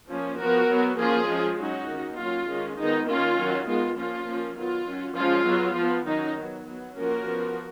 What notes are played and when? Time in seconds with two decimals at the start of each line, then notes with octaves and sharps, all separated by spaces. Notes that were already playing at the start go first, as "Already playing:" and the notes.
0.08 F3 A#3 C#4
0.38 F3 B3 F#4 A#4
0.68 F#3 B3
0.98 F3 A#3 C#4 F4 G#4
1.28 F3 G#3 C#4
1.58 F#3 C#4 D#4 F#4
1.88 D#3 A#3 C#4
2.17 F#3 A#3 C#4 F4
2.48 D#3 G#3 C#4
2.77 D#3 G#3 B3 D#4
3.07 D#3 A#3 C#4 F4
3.38 D#3 F#3 C#4
3.67 D#3 G#3 B3 F4
3.96 F3 A#3 C#4 F4
4.27 F3 A#3 C#4
4.57 D#3 F#3 B3 F4
4.87 F#3 C#4
5.16 F3 G#3 C#4 F4
5.46 F#3 B3
5.76 F3 B3
6.06 D#3 F#3 C#4 D#4
6.37 F#3 B3
6.65 F#3 B3
6.96 F3 A#3 C#4 F#4 A#4
7.25 F3 B3